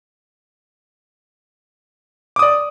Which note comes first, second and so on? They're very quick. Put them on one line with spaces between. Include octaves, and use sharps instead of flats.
D6 D#6 D5